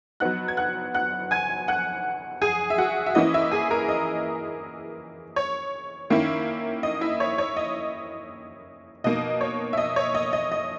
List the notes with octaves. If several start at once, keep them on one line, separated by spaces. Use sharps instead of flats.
F#3 B3 D#4 F#5 F#6
G#6
F#5 F#6
F#5 F#6
G#5 G#6
F#5 F#6
G#4 G#5
E5
F#4 F#5
E5
E3 A#3 C#4 E4 D#5
E4 E5
G#4 G#5
A#4 A#5
D#5
C#5
D#3 A#3 C#4 E4
D#5
E4 E5
C#5
C#5
D#5
B2 A#3 D#4 D#5
C#5
E5
D#5
C#5
D#5
D#5
D#5